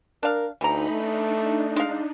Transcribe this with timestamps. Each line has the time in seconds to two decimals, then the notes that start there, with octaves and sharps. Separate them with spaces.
0.23 D4 A#4 F5
0.61 D2 E3 D#4 A#5 B5
0.90 A3 D4 D#4
1.76 G#3 F5